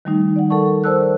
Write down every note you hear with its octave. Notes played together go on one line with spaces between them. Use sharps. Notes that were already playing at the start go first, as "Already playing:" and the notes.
D#3 F3 G3 A3 D#4
D5 F#5
A4 A#4 F#5 A5 C#6
A#4 C5 D5 A5 E6 F#6